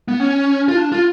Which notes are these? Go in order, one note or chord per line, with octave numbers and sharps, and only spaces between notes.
B3
C#4
F4
D4
F4